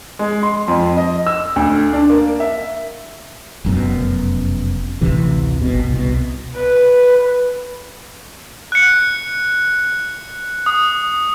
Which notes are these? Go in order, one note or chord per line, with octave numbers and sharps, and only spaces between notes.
G#3
C6
F2
D#5
E6
D2
D4
A#3
E5
F1 F#2 B2
A1 D2 C3 E3
G1 B2
C2 B2
B4
F#6 C#7
D#6